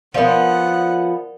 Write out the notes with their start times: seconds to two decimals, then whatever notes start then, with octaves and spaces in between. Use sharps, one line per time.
0.14 F3 B3 A#4 D5 E5 F#5